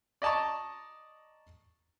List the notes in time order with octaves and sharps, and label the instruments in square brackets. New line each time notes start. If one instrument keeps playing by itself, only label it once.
[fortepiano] D5 D#5 A5 A#5 C#6